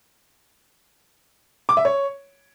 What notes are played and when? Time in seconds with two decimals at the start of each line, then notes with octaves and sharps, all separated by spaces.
1.69 D6
1.77 E5
1.85 C#5